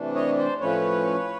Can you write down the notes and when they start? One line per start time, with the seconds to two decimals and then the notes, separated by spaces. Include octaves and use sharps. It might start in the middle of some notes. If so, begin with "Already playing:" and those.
Already playing: C3 E3 A3 D4
0.15 C#5 D#5
0.38 C5 D5
0.60 A2 F3 A3 C#4 B4 C#5